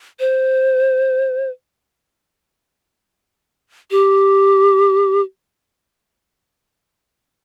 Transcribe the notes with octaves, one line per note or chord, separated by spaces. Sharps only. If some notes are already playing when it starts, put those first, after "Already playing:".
C5
G4